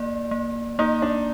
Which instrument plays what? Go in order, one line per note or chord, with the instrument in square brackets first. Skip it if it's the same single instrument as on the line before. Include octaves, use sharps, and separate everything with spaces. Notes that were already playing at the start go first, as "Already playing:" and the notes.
Already playing: [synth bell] A#3 D5
A#3
[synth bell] A#3 [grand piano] D#4
[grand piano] D4